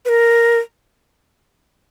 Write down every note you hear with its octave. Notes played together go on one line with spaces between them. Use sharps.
B4
A#4